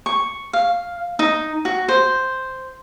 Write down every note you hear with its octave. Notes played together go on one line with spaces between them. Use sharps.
C#6
F5
D#4
F#4
C5